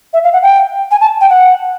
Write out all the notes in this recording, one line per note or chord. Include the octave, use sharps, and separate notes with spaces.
E5
F5
F#5
G5
G#5
A5
G5
F#5